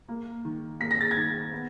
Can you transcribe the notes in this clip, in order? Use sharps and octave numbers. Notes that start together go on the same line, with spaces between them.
A#3
D#3
A#3 B6
A#6
A6
G#6 A#6
D#3
B3